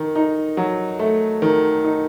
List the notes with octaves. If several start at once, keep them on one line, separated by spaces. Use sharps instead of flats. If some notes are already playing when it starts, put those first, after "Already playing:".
Already playing: D#3
D#4
F#3
A3
D#3
D#4